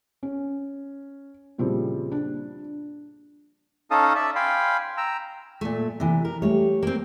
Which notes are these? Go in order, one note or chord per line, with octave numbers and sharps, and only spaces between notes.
C#4
A#2 C#3 F3 G3 C4 E4
D4
C#4 D#4 A4 F5 A5 D#6
D5 E5 A5
F5 G5 G#5 B5 C6
G5 A#5 E6
A#2 A3
C3 E3
A#4
G3 A3 G4 C#5
A#3 C4